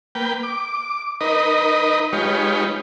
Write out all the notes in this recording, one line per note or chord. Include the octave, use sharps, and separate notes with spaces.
A#3 B4 G5
D6
D#4 A#4 B4 D#5
G#3 D#4 F4 G4 B4 C#5